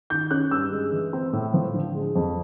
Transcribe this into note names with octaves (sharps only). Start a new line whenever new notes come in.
D#3 G6
C#4 F#6
G2 E6
G#3
E3
C4
A2
F3
D3
G#3
F2